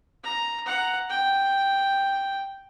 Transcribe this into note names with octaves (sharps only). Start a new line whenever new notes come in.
A#5
F#5 A#5
G5